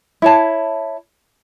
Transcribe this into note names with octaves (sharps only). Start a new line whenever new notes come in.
E4 C#5 A5